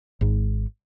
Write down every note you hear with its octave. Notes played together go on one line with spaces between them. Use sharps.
G#1 G#2